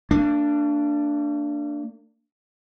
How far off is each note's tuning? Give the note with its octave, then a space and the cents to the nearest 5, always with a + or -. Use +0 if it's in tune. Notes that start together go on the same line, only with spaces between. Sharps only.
A#3 -45 D4 +0